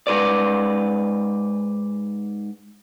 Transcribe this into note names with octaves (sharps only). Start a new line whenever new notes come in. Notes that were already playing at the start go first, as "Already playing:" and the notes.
G#2 B4 D5